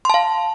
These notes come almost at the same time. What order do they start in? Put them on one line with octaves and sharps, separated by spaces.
C6 A5 F5